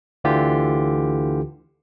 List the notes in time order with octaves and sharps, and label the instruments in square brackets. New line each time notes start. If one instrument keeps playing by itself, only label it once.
[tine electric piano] D2 D3 E3 F4 G4